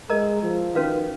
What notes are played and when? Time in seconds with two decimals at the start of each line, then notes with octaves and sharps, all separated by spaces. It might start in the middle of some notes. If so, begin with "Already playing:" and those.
0.10 G#3 A#4 D#5 A#5
0.43 F3
0.75 D#3 C#4 F#4 B4 F5